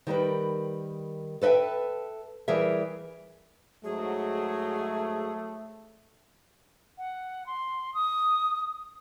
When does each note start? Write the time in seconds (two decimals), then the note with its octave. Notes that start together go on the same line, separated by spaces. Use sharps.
0.07 D#3 G3 A#4 B4
1.42 A4 B4 D#5 E5 G5
2.48 E3 G3 G#4 A#4 E5
3.84 G#2 F#3 A3 G#4
6.98 F#5
7.46 C6
7.94 D#6